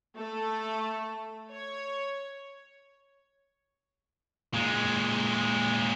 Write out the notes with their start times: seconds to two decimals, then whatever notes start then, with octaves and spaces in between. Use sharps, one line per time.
0.16 A3 A4
1.52 C#5
4.54 A#2 G#3